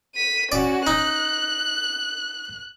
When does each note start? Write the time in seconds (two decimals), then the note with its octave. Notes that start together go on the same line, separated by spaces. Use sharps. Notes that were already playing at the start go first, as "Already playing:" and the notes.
0.16 B6 D#7
0.52 C#4 F#4 D5
0.87 D#4 F#6